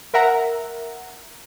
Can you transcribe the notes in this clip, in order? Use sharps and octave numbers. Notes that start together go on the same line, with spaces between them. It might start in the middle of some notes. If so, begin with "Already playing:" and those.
A#4 E5 F#5 A#5